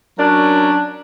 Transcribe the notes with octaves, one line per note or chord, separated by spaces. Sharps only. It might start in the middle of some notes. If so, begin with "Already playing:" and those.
F#3 C#4 D4 A#4